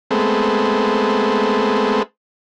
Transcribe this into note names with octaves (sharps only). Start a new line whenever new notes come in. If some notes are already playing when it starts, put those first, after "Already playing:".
G#3 A3 B3 C4